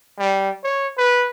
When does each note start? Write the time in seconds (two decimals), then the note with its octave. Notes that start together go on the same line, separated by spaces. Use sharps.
0.19 G3
0.64 C#5
0.98 B4